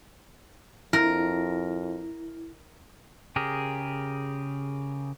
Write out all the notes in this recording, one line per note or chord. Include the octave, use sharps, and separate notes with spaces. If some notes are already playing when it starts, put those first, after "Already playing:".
F2 E4 A#4
C#3 G4 G#4 A#4